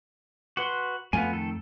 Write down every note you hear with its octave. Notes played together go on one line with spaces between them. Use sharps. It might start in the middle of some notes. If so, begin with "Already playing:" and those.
F#4 B4 C6
F2 A3 B3 F4 G#5
D#3 A4